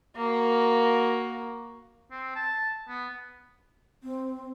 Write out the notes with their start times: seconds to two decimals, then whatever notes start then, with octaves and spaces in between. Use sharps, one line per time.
0.16 A#3 F#4
2.11 C4
2.36 A5
2.89 B3
4.03 C4